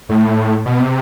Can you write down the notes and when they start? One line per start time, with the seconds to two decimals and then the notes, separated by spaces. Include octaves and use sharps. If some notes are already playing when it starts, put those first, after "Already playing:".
0.09 A2
0.66 B2
0.80 C3